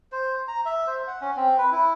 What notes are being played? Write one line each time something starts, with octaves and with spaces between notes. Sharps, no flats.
C5
A#5
E5
C5
F#5
C#4
C4
B4
E4